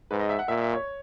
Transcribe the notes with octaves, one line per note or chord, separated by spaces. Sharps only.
G#2 B4
D#5
E5
F#5
A#2 E5
E5
C#5